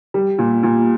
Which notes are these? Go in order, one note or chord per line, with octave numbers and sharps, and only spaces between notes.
G3
A#2
A#2